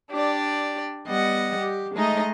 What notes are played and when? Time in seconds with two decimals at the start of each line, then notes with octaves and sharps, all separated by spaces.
0.11 D4 G4 D5
1.07 G3 B3 D#5 F#5
1.59 G4
1.93 G#3 A3 D#4 D#5